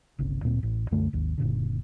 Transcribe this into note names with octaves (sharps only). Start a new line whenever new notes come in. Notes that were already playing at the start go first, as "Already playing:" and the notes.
G1 C2 C#3
D1 A#2 C4
A1
C2 F#2 D3 A3
G#1 D#2
F#1 A#2 D3